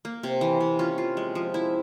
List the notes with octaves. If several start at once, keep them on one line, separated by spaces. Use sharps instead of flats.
A#3
C3
E3
C3
C#4 F4
F4
G#3
F3
E4